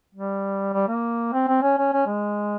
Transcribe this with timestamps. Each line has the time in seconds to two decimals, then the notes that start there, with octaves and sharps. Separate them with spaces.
0.15 G3
0.73 G3
0.88 A#3
1.33 C4
1.48 C4
1.62 C#4
1.78 C#4
1.93 C#4
2.07 G#3